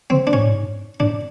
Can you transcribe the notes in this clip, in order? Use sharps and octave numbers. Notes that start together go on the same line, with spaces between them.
C#3 C4
D4
G#2 C#4
A2
G#2
G#2 D4